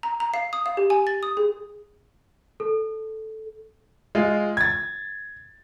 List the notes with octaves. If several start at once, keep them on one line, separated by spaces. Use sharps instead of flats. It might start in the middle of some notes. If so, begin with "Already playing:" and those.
A#5
A#5
F5
D#6
F5
G4
G#5
A6
D#6
G#4
A4
G#3 F4
G#6 A6